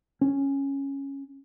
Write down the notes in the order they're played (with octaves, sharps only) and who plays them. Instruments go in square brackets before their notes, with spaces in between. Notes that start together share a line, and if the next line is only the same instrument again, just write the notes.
[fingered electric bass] C#4